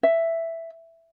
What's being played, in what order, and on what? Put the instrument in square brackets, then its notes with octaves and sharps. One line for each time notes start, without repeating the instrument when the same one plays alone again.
[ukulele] E5